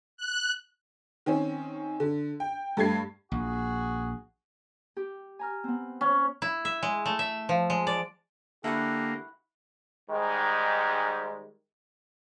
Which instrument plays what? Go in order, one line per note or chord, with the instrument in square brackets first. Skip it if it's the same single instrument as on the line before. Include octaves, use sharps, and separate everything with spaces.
[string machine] F#6
[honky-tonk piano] D#3 C4 C#4
D3
G5
G2 A3 G4 G#6 C7
[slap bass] A#1 [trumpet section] F#4 G#4
[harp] G4
G#5 A#5 F6
B3 C4
[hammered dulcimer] C#4
[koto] E4
E5
G#3
A3
E5
F3
G#3
D5
[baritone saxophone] D3 [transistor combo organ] A#3 [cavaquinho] E4 F#4 F#5 [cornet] G4
[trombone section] G#2 D#3 G3 G#3